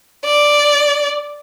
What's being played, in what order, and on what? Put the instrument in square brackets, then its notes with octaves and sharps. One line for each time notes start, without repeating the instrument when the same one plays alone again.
[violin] D5